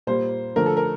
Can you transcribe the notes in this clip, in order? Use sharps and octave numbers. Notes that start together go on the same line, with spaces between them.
A#2 G3 A#3 C5
D3 F3 A3 A#4
A4
A#4